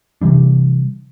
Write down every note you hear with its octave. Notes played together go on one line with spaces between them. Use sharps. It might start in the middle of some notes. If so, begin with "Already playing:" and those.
C3 E3 G3 D4